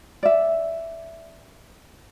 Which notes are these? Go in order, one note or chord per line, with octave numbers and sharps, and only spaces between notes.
D5 E5